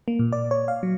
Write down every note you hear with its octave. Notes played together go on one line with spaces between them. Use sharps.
A#3
A#2
D5
C#5
F5
F#3